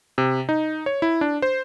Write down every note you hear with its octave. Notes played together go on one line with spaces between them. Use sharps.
C3
D#4
C#5
E4
D4
C5